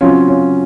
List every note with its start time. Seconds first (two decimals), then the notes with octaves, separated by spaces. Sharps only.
0.01 C#3 F#3 C4 C#4 F4
0.28 C#4